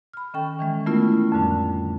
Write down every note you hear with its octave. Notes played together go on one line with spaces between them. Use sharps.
B5 F6
D#3 C#4 A4 G5 C#6
D#3 E3 G#3
A3 B3 C#4 E4 F4 A#4
F2 A2 D3 G3 D4